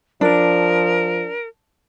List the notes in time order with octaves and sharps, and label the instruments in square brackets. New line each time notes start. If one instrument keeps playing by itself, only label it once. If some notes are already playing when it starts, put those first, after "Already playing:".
[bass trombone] F3 [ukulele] D4 [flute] A#4